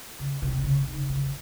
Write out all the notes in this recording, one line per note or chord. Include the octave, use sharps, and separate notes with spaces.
C#3
C3
C#3
D#3
C#3